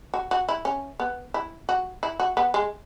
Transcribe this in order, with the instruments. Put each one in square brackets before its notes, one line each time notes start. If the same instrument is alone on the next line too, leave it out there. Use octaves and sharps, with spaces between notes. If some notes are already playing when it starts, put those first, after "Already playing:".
[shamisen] F#4
F#4
E4
C#4
B3
E4
F#4
E4
F#4
B3
G#3